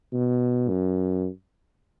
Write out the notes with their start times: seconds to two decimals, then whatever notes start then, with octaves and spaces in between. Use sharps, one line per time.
0.13 B2
0.69 F#2